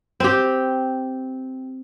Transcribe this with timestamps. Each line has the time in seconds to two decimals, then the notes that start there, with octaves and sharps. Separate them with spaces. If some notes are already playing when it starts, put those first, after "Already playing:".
0.20 C4 G4